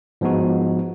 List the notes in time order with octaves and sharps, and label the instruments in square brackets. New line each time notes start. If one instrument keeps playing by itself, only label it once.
[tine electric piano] G#2 F3 G#3 B3 D#4 F#4